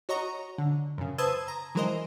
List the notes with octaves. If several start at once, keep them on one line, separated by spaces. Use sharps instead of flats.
F#4 C#5 D#5 A#5 C#6
D3
F#2 C#3
B4 C5 A5 D#6 E6 G#6
A#5
E3 F#3 G#3 A#4 C5 D#5